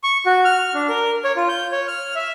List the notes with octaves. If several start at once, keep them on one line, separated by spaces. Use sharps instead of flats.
C#6
F#4
F6
D4
A#4
C#5
F4
G6
C#5
F6
E5